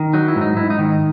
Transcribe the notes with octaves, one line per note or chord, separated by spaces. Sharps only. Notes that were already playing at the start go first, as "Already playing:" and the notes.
Already playing: D#3
F#3 D#4
E4
G#2
D#4
G#2 E4
D#4
D#3